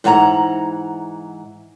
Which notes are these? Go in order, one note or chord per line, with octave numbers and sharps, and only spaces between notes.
G#2 E3 F#5 A5 A#5